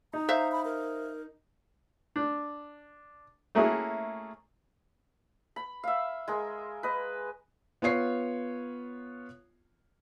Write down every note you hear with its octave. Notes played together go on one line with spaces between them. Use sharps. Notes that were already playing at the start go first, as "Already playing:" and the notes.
D#4 A#5
C5 E5 F5
B5
A#4
D4
A3 A#3 C#4 E4 F#4 G#4
B5
E5 F5
G#3 A#4
B4 D#5
B3 F4 C#5 C7